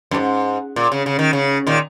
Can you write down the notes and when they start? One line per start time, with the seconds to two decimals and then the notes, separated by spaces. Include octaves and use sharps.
0.11 F#2
0.14 G#2
0.76 A#2
0.92 C#3
1.06 C#3
1.19 D#3
1.33 C#3
1.67 A#2 D#3